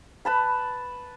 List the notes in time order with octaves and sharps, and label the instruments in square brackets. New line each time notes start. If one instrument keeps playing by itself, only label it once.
[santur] B4 A5 B5